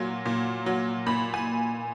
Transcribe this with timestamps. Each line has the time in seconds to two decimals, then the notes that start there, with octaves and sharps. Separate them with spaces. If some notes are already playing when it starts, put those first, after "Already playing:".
Already playing: A#2 F#3
0.26 A#2
0.66 F#3
1.06 A#2 B5
1.34 G#5